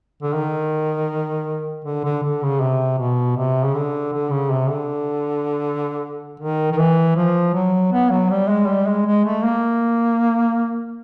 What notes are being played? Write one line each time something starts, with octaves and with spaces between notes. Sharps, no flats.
D3
D#3
D3
D3
D3
C#3
C3
B2
C3
C#3
D3
D3
C#3
C3
D3
D#3
D#3
E3
F3
F#3
B3
F#3
G3
G#3
G3
G#3
G#3
A3
A#3